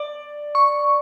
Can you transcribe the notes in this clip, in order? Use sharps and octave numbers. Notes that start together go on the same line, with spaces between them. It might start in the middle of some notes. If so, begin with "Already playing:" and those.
Already playing: D5
C#6